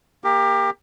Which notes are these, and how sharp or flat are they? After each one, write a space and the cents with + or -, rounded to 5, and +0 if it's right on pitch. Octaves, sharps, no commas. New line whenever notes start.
A#3 +0 G4 +25 A#4 +0